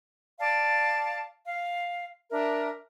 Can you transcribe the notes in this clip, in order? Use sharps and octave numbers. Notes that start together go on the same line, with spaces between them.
D5 F5 A5
F5
D4 A#4 E5